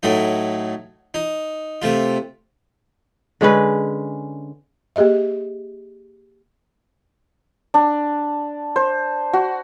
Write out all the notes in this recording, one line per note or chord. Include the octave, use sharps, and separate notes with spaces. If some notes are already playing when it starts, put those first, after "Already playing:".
A2 F#3 A3 D#4
D#4
C3 A3 F4
D3 G#3 C#4 B4
A#3 G4 G#4 D#5 E5
D4
C5
F#4